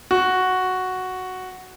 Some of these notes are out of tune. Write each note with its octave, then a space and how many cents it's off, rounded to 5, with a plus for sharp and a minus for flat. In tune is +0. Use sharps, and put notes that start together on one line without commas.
F#4 +0